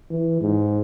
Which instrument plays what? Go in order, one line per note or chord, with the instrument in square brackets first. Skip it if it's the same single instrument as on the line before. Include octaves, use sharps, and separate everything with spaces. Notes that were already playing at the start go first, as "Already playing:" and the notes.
[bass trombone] E3
G#2